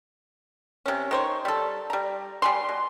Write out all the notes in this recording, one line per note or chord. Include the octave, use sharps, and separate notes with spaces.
C3 C#4
D#3 C5 C#5
G3 A4
G3 A#5
G3 G#5 C6
B2